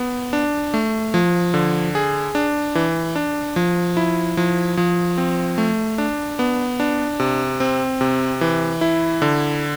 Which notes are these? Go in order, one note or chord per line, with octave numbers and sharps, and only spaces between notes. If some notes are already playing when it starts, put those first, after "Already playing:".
Already playing: B3
D4
A3
F3
D3
G#4
D4
E3
D4
F3
E4
F3
F3
C4
A3
D4
B3
D4
C3
C4
C3
E3
E4
D3